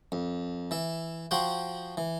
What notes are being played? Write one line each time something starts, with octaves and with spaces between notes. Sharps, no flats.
F2
E3 E5
F3 F#4 F#5 G5 C6
E3